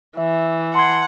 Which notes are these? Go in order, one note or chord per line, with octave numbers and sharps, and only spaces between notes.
E3 E5
F#5 A5 C6 G#6